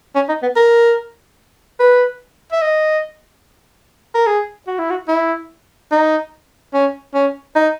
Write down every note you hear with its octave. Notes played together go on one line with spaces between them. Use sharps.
C#4
D#4
B3
A#4
B4
E5
D#5
A#4
G#4
F#4
E4
F#4
E4
D#4
C#4
C#4
D#4